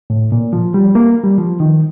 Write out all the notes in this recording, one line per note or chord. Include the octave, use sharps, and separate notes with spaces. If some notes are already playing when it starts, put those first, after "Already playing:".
A2
A#2
F3
G3
A#3
G3
F3
D#3